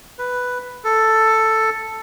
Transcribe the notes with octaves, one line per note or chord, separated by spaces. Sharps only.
B4
A4